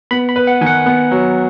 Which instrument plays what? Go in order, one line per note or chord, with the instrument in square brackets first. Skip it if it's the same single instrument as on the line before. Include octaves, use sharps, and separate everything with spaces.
[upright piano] B3 [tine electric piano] B5
[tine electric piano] B5
[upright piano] B4
[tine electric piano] F#5
[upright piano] D#3 [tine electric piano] G#5
[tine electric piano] F#5
[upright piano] B3
F#3